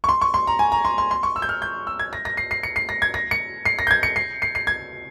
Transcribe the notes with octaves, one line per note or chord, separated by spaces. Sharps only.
C#6
C6
C#6
C6
A#5
G#5
A#5
C6
C6
C6
C#6
E6
G6
F6
G6
E6
G#6
A#6
A#6
C7
C7
C#7
C7
A#6
G#6
A#6
C#7
C7
A#6
G6
G#6
C#7
C7
C7
C7
G#6